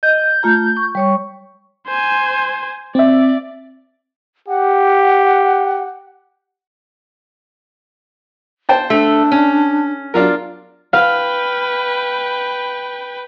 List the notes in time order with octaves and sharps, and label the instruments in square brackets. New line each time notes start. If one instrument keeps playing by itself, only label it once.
[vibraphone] D#5 [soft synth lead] G6
[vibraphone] A3 F4 A#5
C#6
G3 C#5 C#6
[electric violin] C5 G#5
[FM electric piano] C4 E5 [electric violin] D5
[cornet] G4 [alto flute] F#5
[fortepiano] C5 G5 A5
[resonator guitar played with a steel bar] A3 [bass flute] D4
[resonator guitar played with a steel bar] C#4
[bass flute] F#3 [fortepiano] D4 F4 A#4
[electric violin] B4 G5 [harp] F5